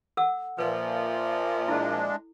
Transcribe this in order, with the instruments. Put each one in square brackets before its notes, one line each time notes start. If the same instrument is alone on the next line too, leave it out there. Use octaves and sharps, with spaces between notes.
[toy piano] A4 F#5 E6
[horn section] A#2 F3 [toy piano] B4 [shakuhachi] E5
[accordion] G#3 D4 [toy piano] E4 A4